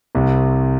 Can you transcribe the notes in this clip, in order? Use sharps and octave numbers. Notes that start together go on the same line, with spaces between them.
C2